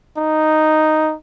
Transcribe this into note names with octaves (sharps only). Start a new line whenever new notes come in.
D#4